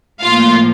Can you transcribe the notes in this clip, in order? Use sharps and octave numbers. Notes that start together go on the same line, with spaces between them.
A2 F3 A#3 F4 F5